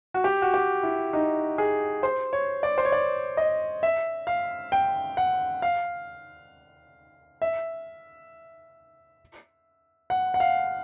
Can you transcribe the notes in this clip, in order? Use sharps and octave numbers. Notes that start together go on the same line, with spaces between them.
F#4
G4
F#4
G4
E4
D#4
G#4
C5
C#5
D5
C5
C#5
D5
D#5
E5
F5
G5
F#5
F5
E5
F#5
F#5
F5